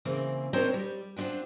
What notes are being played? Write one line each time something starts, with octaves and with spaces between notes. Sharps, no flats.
C#3 E3 A#3 C4
C4 D4 D#4 A#4 C5 C#5
G3
C4 D4 D#4 F4 F#4